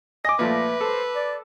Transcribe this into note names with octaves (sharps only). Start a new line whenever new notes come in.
D#5 G#5 D6 A#6
A#2 F3 A3 B4 E5
A4 C5
D5